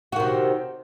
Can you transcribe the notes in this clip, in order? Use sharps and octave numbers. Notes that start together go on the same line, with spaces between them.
C3 D#3 F#4